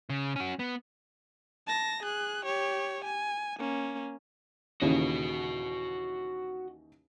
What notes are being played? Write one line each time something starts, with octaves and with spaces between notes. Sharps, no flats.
C#3
C#4 F#4
B3
A5 A#6
G#4 F#6
G4 C#5
G#5
A#3 C#4
D#2 C#3 E3 F#4 D#5